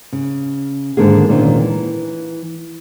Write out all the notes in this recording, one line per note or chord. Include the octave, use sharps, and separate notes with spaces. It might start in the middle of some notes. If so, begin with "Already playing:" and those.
C#3
G#2 D3 D#3 A#3 G#4
D2 A#2 D#3 C#4 D4 F4
E3